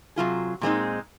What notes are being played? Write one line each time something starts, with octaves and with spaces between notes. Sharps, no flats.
C3 F#3 A#3 F4 G#4
A#2 G#3 C4 D#4